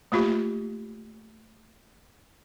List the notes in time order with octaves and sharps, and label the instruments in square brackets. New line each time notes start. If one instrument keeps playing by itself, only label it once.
[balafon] A3 A#3 F4 G4